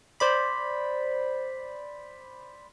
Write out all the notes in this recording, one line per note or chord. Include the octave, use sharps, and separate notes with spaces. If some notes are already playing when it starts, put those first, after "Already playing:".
C5 D5 B5